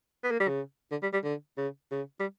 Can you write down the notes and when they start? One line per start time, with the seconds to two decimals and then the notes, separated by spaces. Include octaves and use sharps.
0.23 B3
0.31 A#3
0.40 G3
0.48 C#3
0.91 D3
1.02 G3
1.13 G3
1.24 D3
1.57 C#3
1.91 C#3
2.19 G3